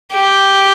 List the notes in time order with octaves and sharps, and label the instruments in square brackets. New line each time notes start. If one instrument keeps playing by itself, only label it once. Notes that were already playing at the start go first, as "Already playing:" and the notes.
[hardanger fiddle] G4